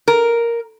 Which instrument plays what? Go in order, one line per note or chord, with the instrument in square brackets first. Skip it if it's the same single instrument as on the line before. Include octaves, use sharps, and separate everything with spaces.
[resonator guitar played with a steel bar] A#4